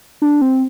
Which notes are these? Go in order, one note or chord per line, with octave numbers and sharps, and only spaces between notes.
D4
C4